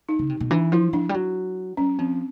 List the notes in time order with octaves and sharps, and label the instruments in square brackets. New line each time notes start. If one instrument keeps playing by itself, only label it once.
[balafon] D#4
[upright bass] C#3
C3
B2
[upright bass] E3 [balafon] D4
[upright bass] F3 [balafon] E4
[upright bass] F3 [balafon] D4
[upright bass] G3
F#3
[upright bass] F#3 [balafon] C#4
[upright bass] F3 [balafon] C4